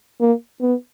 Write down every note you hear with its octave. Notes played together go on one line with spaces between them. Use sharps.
A#3
B3